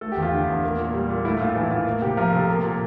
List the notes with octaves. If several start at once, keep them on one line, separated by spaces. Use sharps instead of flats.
A3 A4
E2 G4
F4
D3 G4
E2
A#3
A#2
G3
A#2
A3 E4
A2 F4
E3 E4
A2 F4
A#3
C3 G4
F3 A#4
C3 A4
A#3
A#2